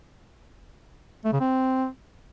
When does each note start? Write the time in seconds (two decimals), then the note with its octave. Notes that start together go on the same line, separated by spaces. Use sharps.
1.25 A3
1.32 C#3
1.40 C4